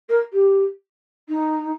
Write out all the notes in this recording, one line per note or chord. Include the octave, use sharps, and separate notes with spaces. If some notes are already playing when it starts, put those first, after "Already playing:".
A#4
G4
D#4